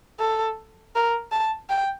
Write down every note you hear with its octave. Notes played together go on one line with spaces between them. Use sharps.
A4
A#4
A5
G5